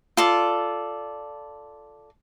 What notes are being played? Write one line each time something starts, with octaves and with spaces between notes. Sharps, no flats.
F4 A4 D5